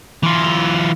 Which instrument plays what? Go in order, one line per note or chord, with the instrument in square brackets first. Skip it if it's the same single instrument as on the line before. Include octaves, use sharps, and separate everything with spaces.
[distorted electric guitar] E3 F4